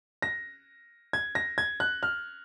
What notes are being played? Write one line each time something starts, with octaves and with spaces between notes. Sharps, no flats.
A#6
G#6
A#6
G#6
F#6
F6